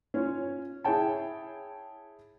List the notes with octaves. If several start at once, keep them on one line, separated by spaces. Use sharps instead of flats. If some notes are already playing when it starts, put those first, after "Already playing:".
C#4 F4 C#5
E4 G#4 C#5 G5 A5